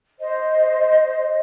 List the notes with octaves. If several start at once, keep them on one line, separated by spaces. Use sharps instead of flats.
C5 D#5